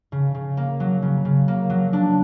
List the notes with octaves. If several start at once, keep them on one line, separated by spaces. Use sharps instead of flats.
C#3
C#3
A#3
F#3
C#3
C#3
A#3
F#3
D4